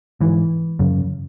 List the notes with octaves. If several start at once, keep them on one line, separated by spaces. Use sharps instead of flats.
G#2 E3
F#2 C#3